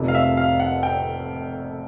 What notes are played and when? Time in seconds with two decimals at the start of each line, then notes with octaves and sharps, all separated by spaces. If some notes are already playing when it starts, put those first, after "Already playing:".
Already playing: F1 F2 C3
0.08 F5
0.15 E5
0.37 F5
0.60 F#5
0.83 G5